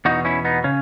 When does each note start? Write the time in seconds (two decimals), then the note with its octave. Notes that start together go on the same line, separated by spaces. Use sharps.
0.05 E2 B2 D#4 F#4
0.25 C#4 E4
0.45 B3 D#4
0.64 C#3 C#4